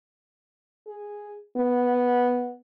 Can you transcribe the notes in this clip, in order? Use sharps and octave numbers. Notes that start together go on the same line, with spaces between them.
G#4
B3